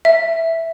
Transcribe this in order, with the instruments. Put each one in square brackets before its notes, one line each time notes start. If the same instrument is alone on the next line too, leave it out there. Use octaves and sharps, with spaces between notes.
[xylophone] E5